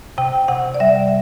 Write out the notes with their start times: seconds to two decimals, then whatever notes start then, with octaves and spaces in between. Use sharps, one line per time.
0.18 C3 G5
0.48 C3 F#5
0.74 D5
0.80 G3 E5